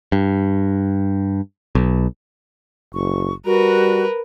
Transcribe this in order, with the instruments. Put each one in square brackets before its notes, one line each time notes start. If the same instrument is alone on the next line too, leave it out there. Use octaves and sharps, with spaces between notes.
[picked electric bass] G2
B1
[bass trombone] F#1 [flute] C#6
[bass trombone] G3 [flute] F#4 [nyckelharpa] A#4 B4